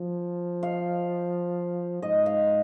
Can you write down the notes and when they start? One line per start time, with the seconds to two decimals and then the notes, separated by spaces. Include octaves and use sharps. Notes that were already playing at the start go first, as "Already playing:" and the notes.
Already playing: F3
0.63 F5
2.02 G#2 D#5
2.26 F5